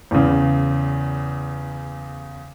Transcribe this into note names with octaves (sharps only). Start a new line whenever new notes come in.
E2 C#3